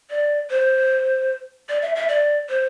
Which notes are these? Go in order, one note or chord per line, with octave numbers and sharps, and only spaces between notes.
D5
C5
D5
E5
E5
D5
C5